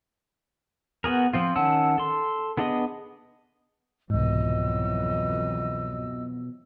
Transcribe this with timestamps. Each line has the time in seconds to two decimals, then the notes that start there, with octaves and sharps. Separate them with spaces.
1.04 B3 F#4 G#4 A#4
1.33 F3 C4 F4
1.56 D#3 C#4 F#5 A5 E6
1.98 A4 C6
2.57 B3 D4 G#4 D#5 D#6
4.10 C2 F2 G#2 B2 E3 F#3 D#5 E6